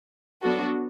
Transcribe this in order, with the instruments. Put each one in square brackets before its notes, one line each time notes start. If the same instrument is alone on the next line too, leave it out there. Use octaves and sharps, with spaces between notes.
[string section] F#3 B3 D4 F#4 A4